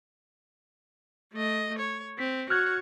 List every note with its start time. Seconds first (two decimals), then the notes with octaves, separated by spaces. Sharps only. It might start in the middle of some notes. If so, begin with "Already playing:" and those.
1.33 A3 D#5
1.79 C#5
2.19 C4 B6
2.50 F#4 C#5 F6 F#6 G#6